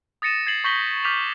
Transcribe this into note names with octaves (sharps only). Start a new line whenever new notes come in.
D#6 A6 A#6 C#7 D#7 E7
G#6 A6 C7 C#7 F#7
C#6 G6 A#6 B6 F#7 G7
D6 F6 G6 B6 D#7 F7